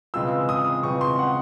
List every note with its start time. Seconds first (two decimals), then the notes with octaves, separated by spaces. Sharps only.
0.14 C#3 E3 G#3 C4 F4 E6
0.49 D#6
0.83 C#3 E3 G#3 C4 F4 C#6
1.01 C6
1.19 F#5